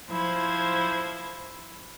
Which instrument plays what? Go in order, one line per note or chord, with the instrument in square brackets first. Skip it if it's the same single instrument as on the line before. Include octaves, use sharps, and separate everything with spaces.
[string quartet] F3 E4 C5 G#6